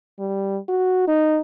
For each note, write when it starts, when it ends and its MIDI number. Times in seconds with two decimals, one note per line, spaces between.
0.19 0.58 55
0.69 1.06 66
1.08 1.40 63